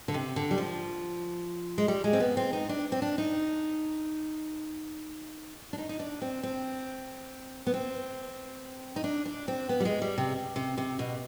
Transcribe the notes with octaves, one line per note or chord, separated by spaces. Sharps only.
D3
C3
D3
G3
F3
G#3
G3
G#3
C4
B3
C4
D#4
D4
C4
D4
D#4
D4
D#4
D#4
D4
C4
C4
B3
C4
D#4
D4
D4
C4
B3
G3
G#3
G3
C3
C3
C3
B2